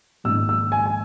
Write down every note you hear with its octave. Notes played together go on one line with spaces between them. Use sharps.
A#1 G#2 D#3 E6
E6
G#5
G#5